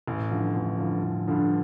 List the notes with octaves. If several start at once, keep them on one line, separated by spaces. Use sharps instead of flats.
A1
G2 D3 F3
A1
G2 D3 F3
A1
G2 D3 F3